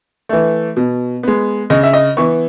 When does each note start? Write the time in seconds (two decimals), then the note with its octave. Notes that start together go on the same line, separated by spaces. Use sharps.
0.29 E3 A3
0.76 B2
1.23 G#3 B3
1.70 C#3 D#5
1.83 E5
1.93 D#5
2.17 E3 B3 C#6